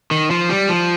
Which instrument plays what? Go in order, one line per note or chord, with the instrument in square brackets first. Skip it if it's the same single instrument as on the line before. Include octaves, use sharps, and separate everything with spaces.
[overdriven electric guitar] D#3
F3
G3
F3